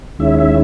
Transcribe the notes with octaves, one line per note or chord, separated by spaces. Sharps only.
D#2 D#3 G#3 C#4 E4 E5
E5